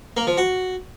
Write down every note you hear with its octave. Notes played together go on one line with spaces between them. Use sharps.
A#3
F3
F#4